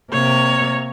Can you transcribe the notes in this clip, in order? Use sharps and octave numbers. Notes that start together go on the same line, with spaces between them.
C3 A#3 C#5